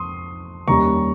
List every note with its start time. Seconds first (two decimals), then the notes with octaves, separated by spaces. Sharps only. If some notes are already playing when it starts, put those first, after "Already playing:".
Already playing: F2 C6 D#6
0.68 D#2 D#3 G3 C#4 A#5 C#6